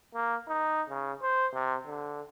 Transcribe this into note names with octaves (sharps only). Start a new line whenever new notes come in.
A#3
D#4
C#3
C5
C3
D3